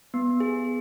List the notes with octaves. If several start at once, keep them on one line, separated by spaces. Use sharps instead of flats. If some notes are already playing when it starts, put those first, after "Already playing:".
B3
G#4